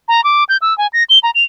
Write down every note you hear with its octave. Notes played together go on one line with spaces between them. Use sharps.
A#5
D6
G6
E6
G#5
A#6
G7
A#5
F7